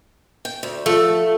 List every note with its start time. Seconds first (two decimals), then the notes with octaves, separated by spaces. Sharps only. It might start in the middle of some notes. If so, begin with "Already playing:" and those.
0.45 G5
0.63 D2
0.86 F3 A3